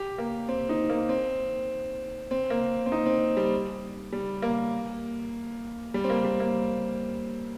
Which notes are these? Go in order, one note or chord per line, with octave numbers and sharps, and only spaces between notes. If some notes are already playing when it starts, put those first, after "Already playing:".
Already playing: G4
A#3
C4
D#4
A#3
C4
C4
A#3
C4
D#4
C4
G3
G3
A#3
G3
C4
A#3
G3
A#3